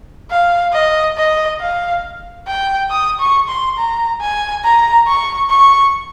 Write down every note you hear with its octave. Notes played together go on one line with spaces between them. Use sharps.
F5
D#5
D#5
F5
G5
D#6
C#6
C6
A#5
G#5
A#5
C#6
C#6